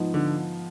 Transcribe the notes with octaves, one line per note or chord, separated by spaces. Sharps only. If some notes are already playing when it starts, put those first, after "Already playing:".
Already playing: G#2 F3 B3 D#4
D3